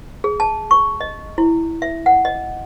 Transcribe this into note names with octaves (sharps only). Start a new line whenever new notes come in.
G#4
A5
C#6
D#5
E4
E5
F#5
D#5